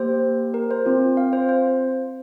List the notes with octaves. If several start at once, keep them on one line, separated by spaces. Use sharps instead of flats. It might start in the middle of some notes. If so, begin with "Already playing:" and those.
Already playing: A#3 G4 C5
A#4
C5
C4 F4
F5
C5
C5